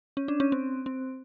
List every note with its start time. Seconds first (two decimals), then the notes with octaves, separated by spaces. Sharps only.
0.17 C#4
0.28 D4
0.40 C#4
0.52 C4
0.86 C4